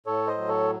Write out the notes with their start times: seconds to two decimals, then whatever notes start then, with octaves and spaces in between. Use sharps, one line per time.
0.06 A2 A4 C#5
0.27 C5 D#5
0.38 F#3
0.49 A4 C#5